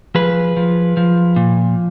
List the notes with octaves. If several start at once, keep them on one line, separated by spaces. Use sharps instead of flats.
F3 G#4 B4
F3
F3
A#2